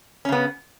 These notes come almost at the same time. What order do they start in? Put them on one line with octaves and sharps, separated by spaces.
C#4 C#3 B3